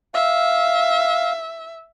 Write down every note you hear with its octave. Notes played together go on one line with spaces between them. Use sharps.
E5 F5